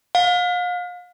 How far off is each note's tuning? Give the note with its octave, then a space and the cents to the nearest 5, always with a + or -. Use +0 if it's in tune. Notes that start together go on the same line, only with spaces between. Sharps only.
F5 +40